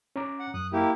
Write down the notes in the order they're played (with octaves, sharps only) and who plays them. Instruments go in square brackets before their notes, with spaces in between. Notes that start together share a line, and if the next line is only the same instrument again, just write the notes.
[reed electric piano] C#4 A#5 D6
[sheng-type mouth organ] F#5
[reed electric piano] F#2 [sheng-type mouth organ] D#6 F#6
[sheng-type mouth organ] A#3 E4 G4